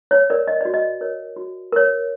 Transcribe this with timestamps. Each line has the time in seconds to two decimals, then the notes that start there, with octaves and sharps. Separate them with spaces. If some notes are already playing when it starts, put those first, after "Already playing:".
0.11 C#5
0.30 A#4 C#5 D5
0.47 D#5
0.61 F#4 D5
0.74 D#5
1.01 A#4 C#5
1.36 F#4
1.72 A#4 C#5